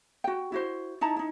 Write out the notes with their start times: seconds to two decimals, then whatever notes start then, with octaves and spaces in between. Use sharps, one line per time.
0.24 F#4 G5
0.52 E4 F#4 C5
1.01 D#4 E4 A5 A#5
1.16 D#4 E4